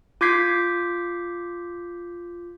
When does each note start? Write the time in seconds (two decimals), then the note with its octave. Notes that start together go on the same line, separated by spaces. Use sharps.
0.21 F4 D6 G6 G#6 B6 C7